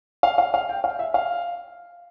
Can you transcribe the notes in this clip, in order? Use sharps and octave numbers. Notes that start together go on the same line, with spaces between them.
F5
F5
F5
G5
F5
E5
F5